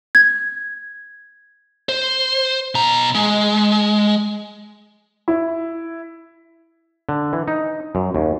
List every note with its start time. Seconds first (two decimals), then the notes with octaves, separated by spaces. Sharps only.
0.15 G#6
1.89 C5
2.75 B2 A#5
3.15 G#3
5.28 E4
7.09 D3
7.33 E3
7.48 D#4
7.95 F#2
8.15 D#2